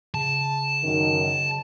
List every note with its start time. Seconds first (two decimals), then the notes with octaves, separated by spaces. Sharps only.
0.14 C#3 A5
0.84 F#2 D#3